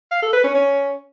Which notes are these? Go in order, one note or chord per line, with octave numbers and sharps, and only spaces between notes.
F5
A4
B4
C#4
C#4